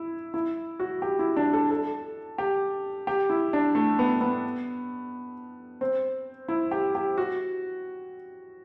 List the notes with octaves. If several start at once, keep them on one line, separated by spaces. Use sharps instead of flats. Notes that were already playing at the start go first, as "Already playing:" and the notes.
Already playing: E4
E4
F#4
G4
E4
D4
A4
A4
G4
G4
E4
D4
A3
B3
B3
C4
E4
G4
G4
F#4